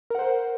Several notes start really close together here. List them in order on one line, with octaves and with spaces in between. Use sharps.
A#4 F#5 C5